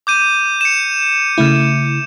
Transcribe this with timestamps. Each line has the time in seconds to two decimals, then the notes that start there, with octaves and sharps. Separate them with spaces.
0.07 D6 G6 D#7
0.61 C#7 E7
1.38 C#3 A3 E4